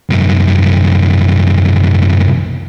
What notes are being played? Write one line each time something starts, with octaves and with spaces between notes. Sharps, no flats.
C2 F#2